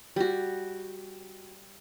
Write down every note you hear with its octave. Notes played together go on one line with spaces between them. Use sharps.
G3 F#4